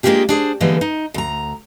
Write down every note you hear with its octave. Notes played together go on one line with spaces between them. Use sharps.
G#3 A#3 D4 F4 G4 G#4
D4 G#4 C5
D3 E3 G3 G#3 A#3 B3
D#4
D2 A#5